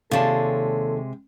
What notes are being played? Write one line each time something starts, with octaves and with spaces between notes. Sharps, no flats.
D#2 C3 G#3 F4 A4 C#5 D5 A5